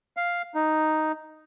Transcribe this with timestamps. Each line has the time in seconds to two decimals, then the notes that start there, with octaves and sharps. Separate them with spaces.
0.17 F5
0.55 D#4